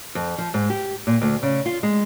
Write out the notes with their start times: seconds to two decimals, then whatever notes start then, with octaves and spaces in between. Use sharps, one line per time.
0.15 F2
0.38 F3
0.54 G#2
0.70 G4
1.07 A#2
1.21 D2
1.43 C#3
1.66 F4
1.83 G#3